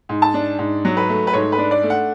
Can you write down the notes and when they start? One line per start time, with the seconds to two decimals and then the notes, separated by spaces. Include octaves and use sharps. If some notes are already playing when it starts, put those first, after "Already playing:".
0.09 G#2
0.22 A5
0.34 D4
0.59 G#2
0.85 F#3
0.97 B4
1.09 A3
1.27 B4
1.33 G#2 C#5
1.52 B4
1.58 D4
1.71 D5
1.83 A3
1.90 F#5